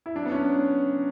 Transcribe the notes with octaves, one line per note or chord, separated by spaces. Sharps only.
E4
F#3 D4
B3
F#3 C#4